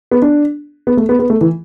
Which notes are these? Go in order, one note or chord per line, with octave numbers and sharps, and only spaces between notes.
B3
D4
B3
A3
B3
B3
A3
E3